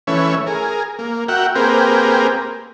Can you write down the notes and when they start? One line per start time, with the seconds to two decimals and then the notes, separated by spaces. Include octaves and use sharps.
0.07 E3 A3 C#4 B4 C#5 E5
0.47 G#4 A#4
0.99 A#3
1.28 F#4 A#4 E5 F#5 G5
1.55 A#3 C4 G4 G#4 A#4 B4